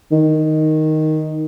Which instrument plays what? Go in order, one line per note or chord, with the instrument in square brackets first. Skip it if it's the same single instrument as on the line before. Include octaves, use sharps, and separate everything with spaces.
[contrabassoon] D#3